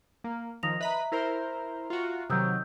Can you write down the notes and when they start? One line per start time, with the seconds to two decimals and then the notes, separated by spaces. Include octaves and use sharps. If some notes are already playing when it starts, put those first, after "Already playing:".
0.24 A#3
0.63 D#3 F3 D#6 A#6 F7
0.81 B4 D#5 E5 A#5 B5
1.12 E4 A#4 C5
1.90 F4 F#4
2.30 C3 D#3 F#3 D#6 E6 G6